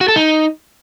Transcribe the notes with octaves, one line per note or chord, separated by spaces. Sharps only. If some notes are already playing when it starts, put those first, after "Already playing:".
F#4
A4
D#4